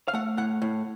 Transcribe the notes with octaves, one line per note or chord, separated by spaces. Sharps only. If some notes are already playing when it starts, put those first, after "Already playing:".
F5
A3 F#5
A2 F#5
A2